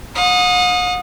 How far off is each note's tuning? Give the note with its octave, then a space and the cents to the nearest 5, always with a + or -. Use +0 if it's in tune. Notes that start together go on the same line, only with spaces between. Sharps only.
F#5 -45 D#6 +0